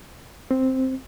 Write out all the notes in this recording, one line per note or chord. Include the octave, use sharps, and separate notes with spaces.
C4